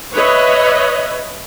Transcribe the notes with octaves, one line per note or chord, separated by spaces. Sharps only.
B4 C#5 D#5 E5